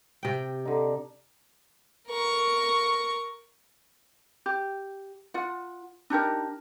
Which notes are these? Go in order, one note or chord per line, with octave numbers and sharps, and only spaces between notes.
C3 G5
D3 D#4
A#4 C#6
G4
F4 F#5
D4 D#4 G4 A#4